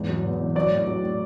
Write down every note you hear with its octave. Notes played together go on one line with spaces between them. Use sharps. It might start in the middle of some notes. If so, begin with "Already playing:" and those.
Already playing: E2 G#2
F#3
B2
E2
F#3 D5
A2
F#3
A2